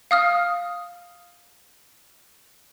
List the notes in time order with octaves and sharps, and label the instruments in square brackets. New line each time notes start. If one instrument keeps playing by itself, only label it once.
[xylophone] F5 D#6 F6